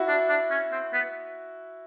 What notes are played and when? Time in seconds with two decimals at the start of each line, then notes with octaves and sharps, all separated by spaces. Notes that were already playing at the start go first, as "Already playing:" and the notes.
Already playing: E4 F#4
0.08 D4
0.29 D4
0.51 C#4
0.72 C4
0.93 B3